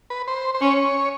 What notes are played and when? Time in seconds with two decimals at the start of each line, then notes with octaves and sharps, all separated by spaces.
0.10 B4
0.28 C5
0.55 C5
0.61 C#4 C#5